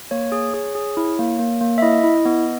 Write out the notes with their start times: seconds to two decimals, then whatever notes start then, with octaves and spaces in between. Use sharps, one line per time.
0.11 A#3 C#5
0.32 G#4
0.54 G#4
0.75 G#4
0.97 E4
1.19 A#3
1.39 A#3
1.61 A#3
1.78 E5
1.82 E4 D#5
2.04 E4
2.26 B3